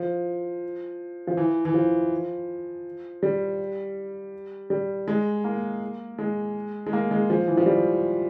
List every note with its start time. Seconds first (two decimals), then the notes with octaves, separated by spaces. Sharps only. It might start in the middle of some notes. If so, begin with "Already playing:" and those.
Already playing: F3
1.27 F3
1.37 E3
1.65 E3
1.74 F3
3.23 G3
4.70 G3
5.08 G#3
5.44 A#3
6.19 G#3
6.87 G#3
6.93 A#3
7.11 G#3
7.30 F3
7.48 E3
7.57 F3
7.66 G3